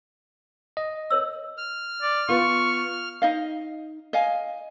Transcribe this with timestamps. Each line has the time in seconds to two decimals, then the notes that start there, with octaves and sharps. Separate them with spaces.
0.77 D#5
1.10 A#4 C#5 E6
1.58 F6
2.02 D5
2.29 B3 F4 C#6
3.22 D#4 D#5 F5
4.13 D#5 F5 G#5